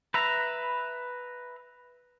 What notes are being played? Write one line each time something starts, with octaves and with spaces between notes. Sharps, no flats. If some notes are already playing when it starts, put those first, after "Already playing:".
B4 E5 A#5